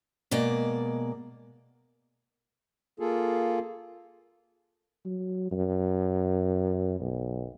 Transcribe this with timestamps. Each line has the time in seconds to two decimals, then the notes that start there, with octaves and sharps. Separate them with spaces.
0.31 B2 G#3 A#3 D5
3.00 A#3 F4 G#4 A4
5.05 F#3
5.51 F#2
7.00 B1